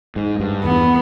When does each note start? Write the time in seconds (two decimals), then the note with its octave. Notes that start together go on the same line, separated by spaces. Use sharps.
0.16 G#2
0.40 G2
0.64 E2 B3